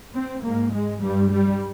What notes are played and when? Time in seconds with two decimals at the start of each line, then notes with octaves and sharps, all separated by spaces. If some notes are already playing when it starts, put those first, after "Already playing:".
0.16 C4
0.44 G#2 A#3
0.73 G#3
1.03 G2 G3
1.31 G3